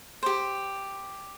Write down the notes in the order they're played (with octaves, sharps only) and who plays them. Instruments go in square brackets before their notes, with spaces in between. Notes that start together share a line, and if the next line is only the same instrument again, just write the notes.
[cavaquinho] G4 C5